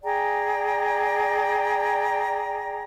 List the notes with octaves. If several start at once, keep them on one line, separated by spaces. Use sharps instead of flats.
G#4 D5 G5 A#5